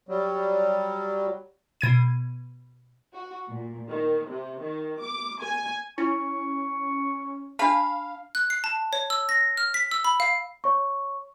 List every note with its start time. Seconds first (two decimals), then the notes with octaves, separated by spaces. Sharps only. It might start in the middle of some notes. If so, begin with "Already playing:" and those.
0.09 F#3 G3
1.81 B2 G#6 D#7
3.14 F#4
3.48 A#2
3.89 D#3
4.28 C3
4.62 D#3
5.01 D6
5.42 G#5
5.98 C#4 E4 C#6
7.59 D4 F5 A5 B5
8.35 F#6
8.50 C7
8.64 A5
8.93 C#5
9.10 E6
9.29 A#6
9.57 F6
9.74 B6
9.91 E6
10.04 B5
10.20 F5
10.64 C#5 C#6